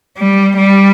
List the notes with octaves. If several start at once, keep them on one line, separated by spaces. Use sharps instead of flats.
G3
G3